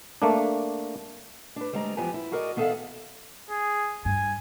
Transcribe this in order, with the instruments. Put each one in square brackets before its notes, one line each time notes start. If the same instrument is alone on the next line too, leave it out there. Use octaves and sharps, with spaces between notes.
[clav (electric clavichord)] A3 A#3 D4
[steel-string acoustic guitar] D4 B4
D2 G3 G#3 C4 G5 A#5
E2 F3 B3 G4 G#5 A#5
E4
F#4 G#4 A#4 D5 D#5
D#3 B3 G#4 A4 E5 F5
[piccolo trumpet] G#4
[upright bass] G2 [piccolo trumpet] G#5